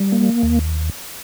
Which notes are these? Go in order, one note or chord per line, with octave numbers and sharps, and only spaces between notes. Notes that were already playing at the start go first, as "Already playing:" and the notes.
Already playing: G3
A#3
D#2